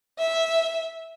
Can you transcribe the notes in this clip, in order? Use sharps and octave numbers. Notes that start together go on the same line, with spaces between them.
E5